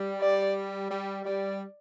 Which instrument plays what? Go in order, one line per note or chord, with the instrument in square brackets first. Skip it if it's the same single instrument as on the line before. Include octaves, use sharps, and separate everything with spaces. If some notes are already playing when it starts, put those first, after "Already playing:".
Already playing: [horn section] G3
[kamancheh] D5
[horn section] G3
[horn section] G3 [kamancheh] D5